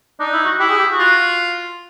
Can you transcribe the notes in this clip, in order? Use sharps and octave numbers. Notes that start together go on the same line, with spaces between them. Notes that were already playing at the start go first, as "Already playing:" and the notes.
D4 D#4
E4
F#4
E4 G4
G#4
G4
F#4
F4